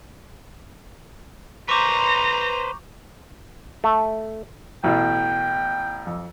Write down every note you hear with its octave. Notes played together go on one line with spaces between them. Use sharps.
B4 C5 A#5 C#6 D6 G6
A3
A1 B2 E4 G5
F2